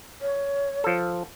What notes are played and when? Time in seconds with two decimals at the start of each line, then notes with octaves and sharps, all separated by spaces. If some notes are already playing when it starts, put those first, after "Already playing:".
0.21 C#5
0.84 F3 A4